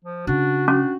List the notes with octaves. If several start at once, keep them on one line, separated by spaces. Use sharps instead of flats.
F3
C#3 D4 F#4
C#4 D4